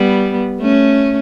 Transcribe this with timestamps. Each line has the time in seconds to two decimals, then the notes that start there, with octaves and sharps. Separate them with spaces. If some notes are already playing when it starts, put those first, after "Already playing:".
Already playing: G3 B3
0.60 A3 C#4